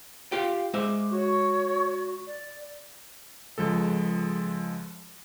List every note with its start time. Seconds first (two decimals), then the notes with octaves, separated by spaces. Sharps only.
0.32 F4 G4 F5 G5
0.74 G#3 C5 E5 D6
1.11 F#4 C#5
2.26 D5
3.58 C#2 F3 G#3 A4